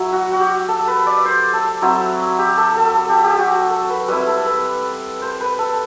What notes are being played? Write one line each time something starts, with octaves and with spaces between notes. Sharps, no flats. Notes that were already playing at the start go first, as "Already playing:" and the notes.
Already playing: F#3 E4
F#4
F#4
G4
A4
B4
D5
C5
A4
F#3 C4 E4
G4
A4
A4
A4
G4
G4
F#4
A4
A4
B4
G3 C4 E4 B4
A4
B4
C5
B4
A4